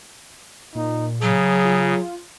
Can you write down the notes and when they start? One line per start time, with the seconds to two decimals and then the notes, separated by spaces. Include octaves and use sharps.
0.75 A#2 D#4
1.22 C#3 F#3 G#4
1.65 F4